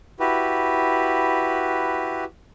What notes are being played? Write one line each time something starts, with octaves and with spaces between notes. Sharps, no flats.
E4 F#4 G4 B4